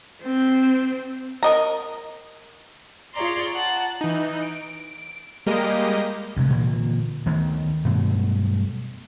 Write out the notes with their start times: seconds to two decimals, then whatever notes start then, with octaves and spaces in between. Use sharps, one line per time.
0.23 C4
1.43 A#4 D#5 A#5
3.15 F4 G#4 C#5 D5 A#5 C6
3.55 F#5 A5
4.01 E3 D#4
4.42 D7
5.46 G3 G#3 A#3 G4 A#4 D#5
6.37 D2 C3 G#3
6.50 A#2 D3 E3 A#3
7.26 D2 D#3 A3 B3
7.85 G2 B2 F#3 A3